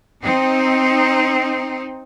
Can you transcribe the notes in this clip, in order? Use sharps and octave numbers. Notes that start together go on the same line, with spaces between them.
C4 D#4